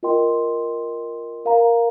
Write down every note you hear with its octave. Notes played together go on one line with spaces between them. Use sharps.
F4 A#4 D#5 G5 C6
A#4 F5 A#5